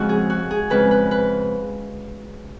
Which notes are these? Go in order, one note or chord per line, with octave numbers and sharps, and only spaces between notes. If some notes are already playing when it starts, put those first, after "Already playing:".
Already playing: F2 C#3 F3 G#3 F#4
G#4
F#4
G#4
F2 C#3 F3 G#3 B4
B4
B4